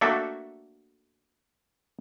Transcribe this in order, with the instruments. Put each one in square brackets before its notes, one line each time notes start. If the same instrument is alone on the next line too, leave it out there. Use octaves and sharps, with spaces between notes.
[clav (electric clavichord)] A3 A#3 D4 F#4 A4 E5